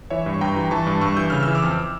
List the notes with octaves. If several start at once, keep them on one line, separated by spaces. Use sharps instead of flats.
E3 C#5 E5
G2
C#6
G2 G5 A#5
E3
E3 A5 C#6
G2
G2 C#6 E6
E3 G6
C#3 F6
E6
E3
D6 F6
F2